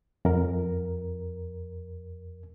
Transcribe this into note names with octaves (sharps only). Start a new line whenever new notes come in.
F2 A#4